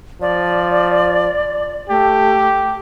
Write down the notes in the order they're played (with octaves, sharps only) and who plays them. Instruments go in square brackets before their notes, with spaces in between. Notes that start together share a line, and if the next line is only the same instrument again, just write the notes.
[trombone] F3 [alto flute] D5
[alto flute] A3 [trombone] G4